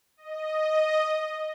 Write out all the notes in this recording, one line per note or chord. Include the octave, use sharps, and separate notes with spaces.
D#5